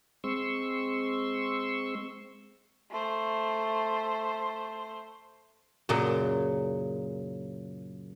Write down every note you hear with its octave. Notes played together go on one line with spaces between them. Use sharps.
G#3 C4 C6 C#6 E6
A3 C5
F#2 A#2 C#3 F#3